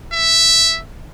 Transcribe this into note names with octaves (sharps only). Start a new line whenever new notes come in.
E5